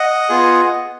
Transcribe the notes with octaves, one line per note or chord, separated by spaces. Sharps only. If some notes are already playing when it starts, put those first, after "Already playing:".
Already playing: D#5 F#5
B3 F4 G#4